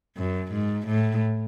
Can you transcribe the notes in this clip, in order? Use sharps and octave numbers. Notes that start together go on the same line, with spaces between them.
F#2
G#2
A2